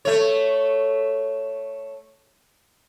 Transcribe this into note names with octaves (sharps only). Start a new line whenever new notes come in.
A3 C#5